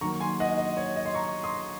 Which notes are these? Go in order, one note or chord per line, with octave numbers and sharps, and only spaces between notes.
D#3 F#3 A#3 A#5 C#6
G#5 C6
D#5 F#5
D#5
C#5
D#5
C6
A#5 C#6
C6 D#6